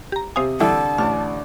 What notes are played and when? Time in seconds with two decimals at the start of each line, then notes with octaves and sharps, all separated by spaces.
0.12 G4 A#5
0.36 C3 C5 F5 G#5 D#6
0.60 D3 E3 G3 E4 A5
0.98 A1 D4 F6